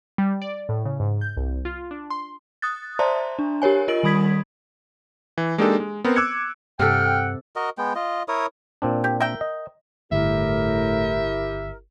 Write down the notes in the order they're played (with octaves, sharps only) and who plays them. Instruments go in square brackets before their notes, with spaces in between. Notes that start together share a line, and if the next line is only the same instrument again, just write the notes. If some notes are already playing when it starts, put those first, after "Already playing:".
[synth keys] G3
D5
A2
C#3
G#2
G6
C2
F4
D4
C6
[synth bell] D#6 F#6 A6
C5 D5 E5 A5 A#5 C6
D4
G4 A#4 C#5 G#5
F4 A#4 D#5 D7 F#7
D#3 G3 B5 D#6 G#6 B6
[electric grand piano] E3
G#3 A#3 D4 D#4 G4 A4
G#3
B3 C4 A#4 C5
D6 E6 F#6 G#6 C#7
[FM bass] G2 [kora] C3 A4 [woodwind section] F#5 G5 [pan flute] F6
[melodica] F#4 A#4 D#5
G#3 B3 G5
F4 D#5
E4 A#4 C#5 D#6
[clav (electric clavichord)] A#2 C4 D4
[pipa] G4
A#4 E5 G5
[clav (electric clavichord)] D#5
[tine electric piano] G1 [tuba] A2 [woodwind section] E4 G4 A#4 [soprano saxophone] E5